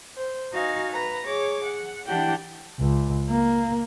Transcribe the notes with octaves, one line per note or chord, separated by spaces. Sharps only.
C5
D#4 F#4 D#5 F5 G#5
B4 A#5 A#6
G#4 C#5 D6
F#5
E3 D4 E4 G4 F#5 G5
C#2
A#3